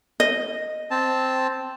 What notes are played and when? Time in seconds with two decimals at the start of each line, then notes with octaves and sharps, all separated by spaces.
0.20 D#5
0.91 C4 A5